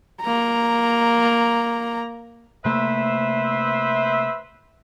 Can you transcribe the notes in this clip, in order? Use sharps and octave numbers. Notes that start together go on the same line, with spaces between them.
A#3 A#5
C3 A3 A#3 B4 C5 E5